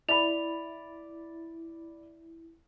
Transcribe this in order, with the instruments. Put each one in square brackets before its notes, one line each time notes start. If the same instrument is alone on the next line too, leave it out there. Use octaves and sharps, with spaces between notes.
[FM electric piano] E4 [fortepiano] D5 B5 [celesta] F7